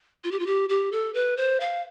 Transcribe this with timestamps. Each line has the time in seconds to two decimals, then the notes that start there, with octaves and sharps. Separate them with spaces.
0.24 F4
0.31 G4
0.39 F4
0.46 G4
0.69 G4
0.92 A4
1.14 B4
1.37 C5
1.60 F5